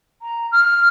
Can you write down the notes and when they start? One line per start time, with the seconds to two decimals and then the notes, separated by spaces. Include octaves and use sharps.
0.22 A#5
0.52 F6